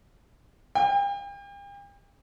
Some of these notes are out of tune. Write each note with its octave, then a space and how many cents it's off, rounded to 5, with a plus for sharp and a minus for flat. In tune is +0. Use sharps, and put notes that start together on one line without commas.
G5 +40